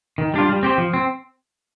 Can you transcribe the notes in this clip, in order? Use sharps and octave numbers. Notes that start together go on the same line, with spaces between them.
D#3
G3 D4 F4
G3
C4 G4 C5
F3
C4